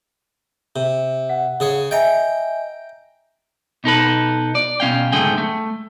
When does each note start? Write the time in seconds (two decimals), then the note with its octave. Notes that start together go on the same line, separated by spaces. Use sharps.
0.76 C3
1.29 F#5
1.60 C#3 G#4 C#5
1.91 D#5 E5 G5 G#5 A#5
3.84 B2 D#4 A4 B4
4.55 D5
4.80 B2 C#4 F5 G5
5.12 C#2 G#2 D3 A3 G#4 G5
5.38 A3